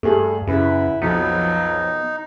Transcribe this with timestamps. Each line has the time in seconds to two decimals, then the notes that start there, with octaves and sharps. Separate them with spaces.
0.03 G2 A3 G#4 A4
0.47 F#2 C#3 E4 B4
1.02 B1 F2 F3 F#3 B3 D#4